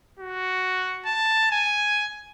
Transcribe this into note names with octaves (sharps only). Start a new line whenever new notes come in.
F#4
A5
G#5